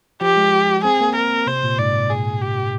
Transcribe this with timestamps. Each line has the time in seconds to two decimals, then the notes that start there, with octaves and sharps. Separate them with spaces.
0.21 F3 G4
0.37 G#3
0.84 C4 G#4
1.01 A#3
1.16 A#4
1.47 C3 C5
1.63 A#2
1.79 G#2 D5
2.10 G#4
2.42 G4